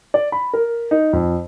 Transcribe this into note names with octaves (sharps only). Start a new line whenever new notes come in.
D5
B5
A#4
D#4
F2